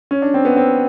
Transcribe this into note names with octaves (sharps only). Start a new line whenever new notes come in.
C#4
D4
C4
B3
C4